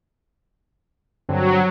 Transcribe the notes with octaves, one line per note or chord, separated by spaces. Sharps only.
G2 D3 F#3 C4